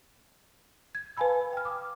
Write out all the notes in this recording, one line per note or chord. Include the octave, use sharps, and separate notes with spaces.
G#6
B4 F5 G#5 A5 B5 E6
G5 F6
D6 D#6